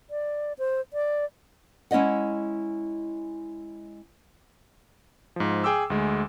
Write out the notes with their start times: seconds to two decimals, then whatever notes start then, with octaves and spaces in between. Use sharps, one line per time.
0.10 D5
0.59 C5
0.93 D5
1.91 G#3 C#4 E4 D#5 F#5
5.36 G#2 F3
5.64 G#4 G5 D6 E6
5.90 D2 G#3